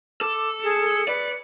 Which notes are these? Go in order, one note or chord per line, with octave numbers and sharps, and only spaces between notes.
A4 D6
G#4 C#7
B4 D5